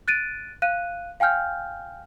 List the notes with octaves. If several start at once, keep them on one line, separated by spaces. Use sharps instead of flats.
F#6 A6 D7 D#7
F5 F#6 D#7
F5 G5 G#5 F6 G6